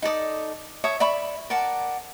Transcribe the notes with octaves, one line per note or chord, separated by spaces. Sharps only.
D#4 A4 D5 D#6
C#5 E5 A5 D#6
D5 E5 B5 C#6
A#4 D5 F#5 A5